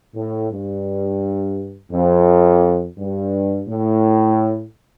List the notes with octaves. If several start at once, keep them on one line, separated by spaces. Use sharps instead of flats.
A2
G2
F2
G2
A2